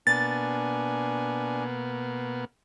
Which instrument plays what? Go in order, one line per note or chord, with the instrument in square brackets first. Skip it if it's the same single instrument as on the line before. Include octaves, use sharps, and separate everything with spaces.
[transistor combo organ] B2 A#3 B3 [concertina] D4 G#5 [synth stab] A6